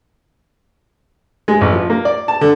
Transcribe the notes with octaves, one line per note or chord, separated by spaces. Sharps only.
G#3
A1
F3
A#3
D5
A5
D3